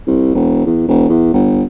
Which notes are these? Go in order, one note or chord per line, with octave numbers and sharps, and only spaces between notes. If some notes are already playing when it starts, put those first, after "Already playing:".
C2
E1
E2
E1
E2
G1